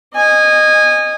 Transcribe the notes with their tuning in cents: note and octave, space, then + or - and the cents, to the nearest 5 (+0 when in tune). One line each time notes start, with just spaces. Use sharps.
D#5 -15 G#5 -20